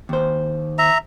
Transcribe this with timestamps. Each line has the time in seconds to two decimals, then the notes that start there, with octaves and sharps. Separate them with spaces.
0.09 D#2 C5
0.78 E5 A#5